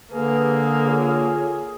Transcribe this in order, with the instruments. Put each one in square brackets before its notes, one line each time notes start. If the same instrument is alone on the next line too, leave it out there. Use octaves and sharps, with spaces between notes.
[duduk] D3 [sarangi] A#3 [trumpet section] G#4 [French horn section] B4
[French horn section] F4 C#5